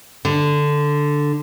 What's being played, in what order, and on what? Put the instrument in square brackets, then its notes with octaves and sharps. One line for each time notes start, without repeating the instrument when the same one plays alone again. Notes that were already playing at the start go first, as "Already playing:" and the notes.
[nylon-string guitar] D3